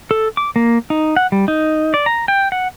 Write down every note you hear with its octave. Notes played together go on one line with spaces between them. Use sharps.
A4
D6
A#3
D#4
F#5
G3
D#4
D5
A#5
G5
F#5